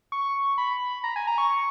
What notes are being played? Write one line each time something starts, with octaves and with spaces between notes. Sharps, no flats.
C#6
B5
A#5
G#5
A#5
C#6